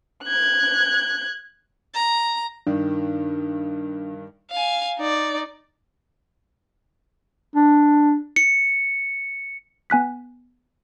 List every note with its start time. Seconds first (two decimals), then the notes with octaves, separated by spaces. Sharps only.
0.24 F#6 G#6
1.94 A#5
2.67 G2 D#3 D4
4.51 F5 G#5
4.98 D#4 D5
7.56 D4
8.36 C#7
9.90 B3 G#5 F#6 B6